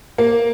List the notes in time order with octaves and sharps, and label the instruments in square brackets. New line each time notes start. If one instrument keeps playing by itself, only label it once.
[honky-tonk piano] A#3